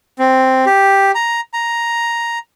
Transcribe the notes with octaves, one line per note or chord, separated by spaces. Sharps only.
C4
G4
A#5
A#5